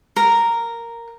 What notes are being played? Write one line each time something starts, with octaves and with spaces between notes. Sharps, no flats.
A#4